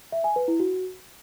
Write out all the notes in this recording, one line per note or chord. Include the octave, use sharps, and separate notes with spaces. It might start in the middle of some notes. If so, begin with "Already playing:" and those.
E5
G#5
B4
E4
F#4